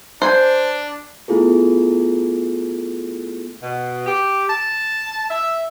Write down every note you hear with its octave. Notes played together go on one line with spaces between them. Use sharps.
D4 C5 G#5
A3 B3 E4 F4 G#4 A4
B2
G4
A5
E5